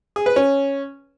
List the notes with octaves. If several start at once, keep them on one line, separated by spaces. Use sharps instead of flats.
G#4
B4
C#4